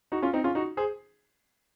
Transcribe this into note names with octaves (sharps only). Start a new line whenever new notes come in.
D#4 F#4
C#4 F4
C4 D#4
C#4 F4
D#4 F#4
G#4 C5